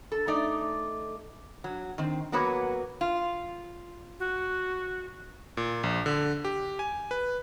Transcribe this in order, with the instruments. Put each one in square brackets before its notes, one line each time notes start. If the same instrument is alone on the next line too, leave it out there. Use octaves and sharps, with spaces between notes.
[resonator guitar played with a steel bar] A4
A3 D#4 D5
F#3
D#3 C4
F#3 A#3 B3 F#4 B4 C#5
F4
[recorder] F#4
[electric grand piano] A#2
A#1
D3
G4
G#5
B4